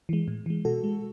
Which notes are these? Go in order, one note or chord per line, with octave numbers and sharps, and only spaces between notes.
E3 G#3
A2
E3 G#3
B2 F#4 A4
G#3